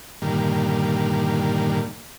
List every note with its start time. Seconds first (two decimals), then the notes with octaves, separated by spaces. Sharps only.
0.22 G2 A#2 D3 D#3 G3 A#3